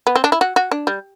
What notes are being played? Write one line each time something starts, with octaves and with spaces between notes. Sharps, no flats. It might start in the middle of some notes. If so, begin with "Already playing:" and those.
B3
C4
D4
E4
F#4
F#4
D4
G3